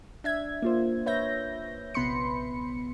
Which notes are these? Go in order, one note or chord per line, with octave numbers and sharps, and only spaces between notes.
D4 E5 G#6
A#3 F4 C5
B4 C#5 E5 G6 A#6
A#1 C3 B3 B5 C6 C#7